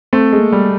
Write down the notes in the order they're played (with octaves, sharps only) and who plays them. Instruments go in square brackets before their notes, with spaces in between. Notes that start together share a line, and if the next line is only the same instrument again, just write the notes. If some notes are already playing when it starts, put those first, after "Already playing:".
[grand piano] A3 [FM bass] C4
[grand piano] G#3
[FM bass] A#3
[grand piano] G3